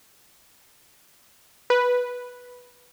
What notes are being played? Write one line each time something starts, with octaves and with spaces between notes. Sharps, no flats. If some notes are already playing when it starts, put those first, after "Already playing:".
B4